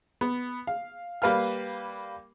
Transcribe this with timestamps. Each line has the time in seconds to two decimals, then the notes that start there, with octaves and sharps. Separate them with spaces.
0.21 B3
0.67 F5
1.22 G3 A#3 B4 F5 F6